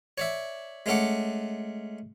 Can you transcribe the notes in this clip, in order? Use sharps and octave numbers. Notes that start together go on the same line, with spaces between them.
C#5 D5 E5
G#3 A3 C#4 A4 F#5 D6